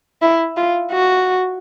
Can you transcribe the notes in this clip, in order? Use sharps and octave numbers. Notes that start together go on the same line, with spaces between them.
E4
F4
F#4